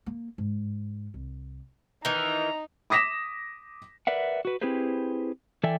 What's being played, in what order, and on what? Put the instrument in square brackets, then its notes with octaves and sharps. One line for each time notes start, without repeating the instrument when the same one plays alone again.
[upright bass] A#3
G#2
C2
[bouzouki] D#3 E3 [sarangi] D#4 [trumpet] A#5
[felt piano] D6 D#6 A#6 B6 E7
[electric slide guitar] A#4 B4 D5 E5 F#5
F#4 B4
C4 E4 G4 G#4 B4 C5
E3 A4 D5 E5 G5 G#5